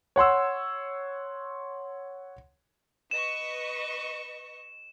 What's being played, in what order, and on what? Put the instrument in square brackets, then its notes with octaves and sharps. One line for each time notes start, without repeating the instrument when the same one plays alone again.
[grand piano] C#5 F#5 C6 E6
[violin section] B4 D#5 C#6 [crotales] E7